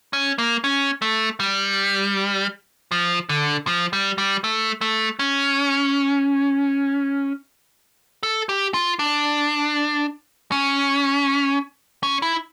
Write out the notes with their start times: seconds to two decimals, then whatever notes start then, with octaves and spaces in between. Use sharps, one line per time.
0.13 C#4
0.38 A#3
0.64 C#4
1.02 A3
1.40 G3
2.92 F3
3.29 D3
3.67 F3
3.93 G3
4.18 G3
4.44 A3
4.81 A3
5.19 C#4
8.23 A4
8.49 G4
8.74 F4
8.99 D4
10.52 C#4
12.03 C#4
12.22 E4